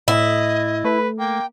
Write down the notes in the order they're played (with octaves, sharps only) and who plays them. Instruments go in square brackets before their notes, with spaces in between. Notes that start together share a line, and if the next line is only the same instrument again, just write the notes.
[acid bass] A2 [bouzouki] E4 [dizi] D#5
[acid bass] A3 [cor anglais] B4
[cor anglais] A#3 [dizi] G5